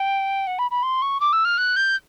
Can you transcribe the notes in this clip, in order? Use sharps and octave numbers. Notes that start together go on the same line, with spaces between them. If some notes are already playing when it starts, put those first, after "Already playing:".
Already playing: G5
F#5
B5
B5
C6
C#6
D6
E6
F6
F#6
G6